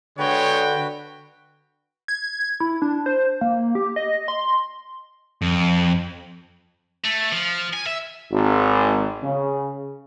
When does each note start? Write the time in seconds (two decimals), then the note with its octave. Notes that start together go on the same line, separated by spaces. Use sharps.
0.18 D3 G#3 B3 F#4 B4 C#5 G5
2.08 G#6
2.60 E4
2.82 D4
3.06 C5
3.41 A#3
3.75 G4
3.96 D#5
4.28 C6
5.42 F2
7.04 A3
7.32 F3
7.73 G#5
7.86 E5
8.30 G#1
9.22 C#3